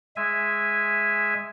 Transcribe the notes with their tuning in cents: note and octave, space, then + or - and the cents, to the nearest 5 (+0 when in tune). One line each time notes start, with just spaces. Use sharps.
G#3 +0 E5 +0 G#5 -10